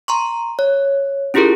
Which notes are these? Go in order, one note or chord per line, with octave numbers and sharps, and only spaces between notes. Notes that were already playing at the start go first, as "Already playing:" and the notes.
A#5 C6 C#6
C#5
C#4 E4 F4 G4 G#4 A#4